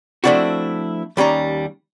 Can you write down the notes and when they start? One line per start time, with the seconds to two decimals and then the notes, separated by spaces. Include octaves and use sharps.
0.24 F3 A3 C4 D4 E4 F#4
1.17 D#2 G3 C#4 A#5